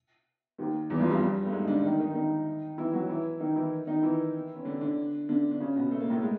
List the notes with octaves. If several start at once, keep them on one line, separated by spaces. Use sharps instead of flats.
D#2 D#3
E2 E3
F2 F3
G2 G3
A3
G#2 G#3
D3 D4
D#3 D#4
D#3 D#4
D#3 D#4
E3 E4
F#3 F#4
E3 E4
D#3 D#4
E3 E4
D#3 D#4
E3 E4
C#4
D3 D4
D3 D4
D3 D4
D4
C#3 C#4
B2 B3
A3
A#3
A2 A3
G#3